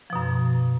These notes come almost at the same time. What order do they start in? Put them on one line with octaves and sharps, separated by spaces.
F3 B2 F#2